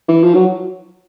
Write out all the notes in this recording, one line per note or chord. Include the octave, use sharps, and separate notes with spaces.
E3
F3
F#3